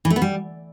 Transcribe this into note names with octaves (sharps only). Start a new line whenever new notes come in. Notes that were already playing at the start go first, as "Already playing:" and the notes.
E3
A3
B3
G3